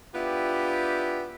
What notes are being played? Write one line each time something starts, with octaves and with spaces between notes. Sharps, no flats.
B3 D4 E4 F4 G4